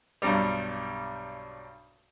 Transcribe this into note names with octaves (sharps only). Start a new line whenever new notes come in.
B1 G2 G3